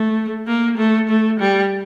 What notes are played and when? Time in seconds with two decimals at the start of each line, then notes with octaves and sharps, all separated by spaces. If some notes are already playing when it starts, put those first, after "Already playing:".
Already playing: A3
0.47 A#3
0.77 A3
1.09 A3
1.39 G3